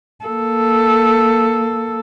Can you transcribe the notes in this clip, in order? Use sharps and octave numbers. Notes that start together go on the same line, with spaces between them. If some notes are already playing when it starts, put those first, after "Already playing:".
A#3 A4